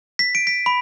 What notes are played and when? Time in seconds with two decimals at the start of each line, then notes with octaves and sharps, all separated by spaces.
0.19 B6
0.35 D7
0.47 B6
0.66 B5